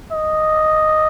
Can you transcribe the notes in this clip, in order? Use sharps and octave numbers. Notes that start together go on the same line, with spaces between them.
D#5